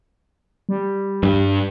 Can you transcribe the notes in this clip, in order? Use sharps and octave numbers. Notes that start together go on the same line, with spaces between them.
G3
G2